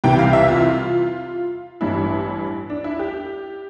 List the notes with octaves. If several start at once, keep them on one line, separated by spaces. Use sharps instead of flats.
C2 C3 E3 G5
F5
E5
F4
A1 G2 E3 E4
D4
E4
G4